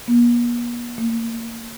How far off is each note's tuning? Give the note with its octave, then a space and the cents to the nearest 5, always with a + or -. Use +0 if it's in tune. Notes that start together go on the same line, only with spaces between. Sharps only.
A#3 +45
A#3 -25